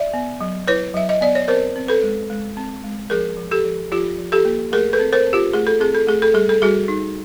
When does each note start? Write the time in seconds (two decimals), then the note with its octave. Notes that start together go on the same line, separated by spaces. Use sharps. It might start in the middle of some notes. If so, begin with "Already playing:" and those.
Already playing: D5 E5
0.14 B3
0.41 F#3
0.68 E4 B4 C#5
0.94 F#3 E5
1.09 D#5
1.21 B3 D5
1.35 C#5
1.48 C4 A#4 C5
1.76 C4
1.88 A4 B4
2.03 G#3
2.30 G#3
2.57 C4
2.84 G#3
3.10 F3 G#4 A#4
3.37 F3
3.51 G4 A4
3.65 F3
3.92 F3 F4 G4
4.18 F3
4.32 G4 A4
4.45 A#3
4.72 A3 G#4 A#4
4.93 A4 B4
4.99 C4
5.13 A#4 C5
5.27 C4
5.33 F4 G4
5.53 A3 G#4
5.67 A4
5.80 C4 G#4
5.95 A4
6.07 A3 G#4
6.22 A4
6.34 G3 G#4
6.49 A4
6.62 G3 F#4 G#4
6.88 D#4